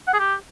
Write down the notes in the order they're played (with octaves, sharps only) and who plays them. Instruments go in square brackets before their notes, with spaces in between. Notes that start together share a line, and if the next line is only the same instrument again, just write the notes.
[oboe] F#5
G#4
G4